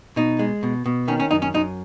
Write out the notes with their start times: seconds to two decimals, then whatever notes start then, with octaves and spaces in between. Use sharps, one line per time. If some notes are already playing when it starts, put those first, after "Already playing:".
0.16 B2 D#4
0.39 G#3
0.63 B2
0.86 B2
1.08 D#3 C#4
1.20 C#4
1.31 F#2 D#4
1.42 C#4
1.54 F#2 D#4